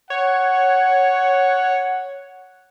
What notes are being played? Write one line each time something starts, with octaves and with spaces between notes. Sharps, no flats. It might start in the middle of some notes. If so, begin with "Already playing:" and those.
C#5 F#5